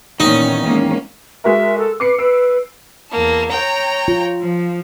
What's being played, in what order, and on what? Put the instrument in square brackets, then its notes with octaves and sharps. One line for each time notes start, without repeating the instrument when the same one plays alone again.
[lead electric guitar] E2 D#3 [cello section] A#2 C#4 [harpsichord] D#4
[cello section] G#3 A#3 C#4
[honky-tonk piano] G#3 F#4 A#4 [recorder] E5
[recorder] A4
[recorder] B4 [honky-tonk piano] D6 C7 C#7
[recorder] B4 [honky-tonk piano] E6 D7
[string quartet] E2 A#3 A5
C#5 G5 A#5
[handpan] F4
[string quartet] F3